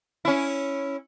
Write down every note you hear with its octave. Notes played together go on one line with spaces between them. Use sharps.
C#4 E4